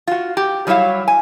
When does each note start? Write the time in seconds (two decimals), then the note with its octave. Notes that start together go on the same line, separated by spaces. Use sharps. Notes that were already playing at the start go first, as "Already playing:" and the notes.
0.07 F4 F#4
0.37 G4
0.67 F#3 G3 A3 E4 C#5 F5
1.08 G#5